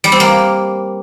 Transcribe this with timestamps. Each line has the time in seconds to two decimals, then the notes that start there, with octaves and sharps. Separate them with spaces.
0.04 G3
0.12 C4
0.20 A#3